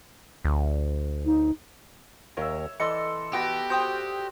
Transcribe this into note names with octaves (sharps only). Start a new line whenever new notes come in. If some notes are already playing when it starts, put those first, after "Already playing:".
D2
D#4
D#2 A#4 C#5 D#5 E5
E3 A4 D5 D#5 C6 C#7
B3 F#4 G4 A5
F#4 C5 G5 D#6 G6